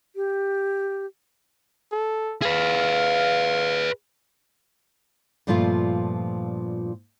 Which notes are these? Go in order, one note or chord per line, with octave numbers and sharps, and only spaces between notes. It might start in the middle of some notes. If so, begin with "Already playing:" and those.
G4
A4
G#4 B4 F5
G2 A#2 F3 A3 F4